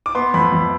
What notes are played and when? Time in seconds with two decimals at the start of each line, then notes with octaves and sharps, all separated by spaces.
0.06 D6
0.15 B3 C6
0.34 F2 B5
0.52 F2